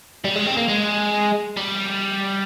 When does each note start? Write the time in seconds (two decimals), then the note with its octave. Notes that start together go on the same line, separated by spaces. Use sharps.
0.25 G3
0.36 G#3
0.46 C4
0.57 A#3
0.69 G#3
1.57 G3